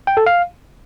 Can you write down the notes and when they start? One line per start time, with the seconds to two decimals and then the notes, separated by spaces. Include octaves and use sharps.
0.07 G5
0.17 A4
0.26 F5